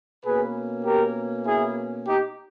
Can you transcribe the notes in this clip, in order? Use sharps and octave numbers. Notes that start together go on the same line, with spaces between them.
B2 A#3 C#4 G#4 B4
G4 A#4
E4 G#4
D#4 G4